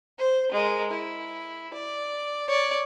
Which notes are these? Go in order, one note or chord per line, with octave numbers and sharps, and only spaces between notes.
C5
G#3 A#4
E4
D5
C#5 D5